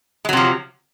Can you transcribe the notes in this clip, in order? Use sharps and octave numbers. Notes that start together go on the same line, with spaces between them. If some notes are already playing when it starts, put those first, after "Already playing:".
C3 F3 F#3 G#3